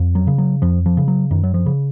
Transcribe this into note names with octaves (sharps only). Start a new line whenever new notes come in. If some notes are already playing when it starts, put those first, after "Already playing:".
Already playing: F2
F#3
C#3
F#3
F2 F3
F3
C#3
F#3
F#2 D#3
F#3
F3
C#3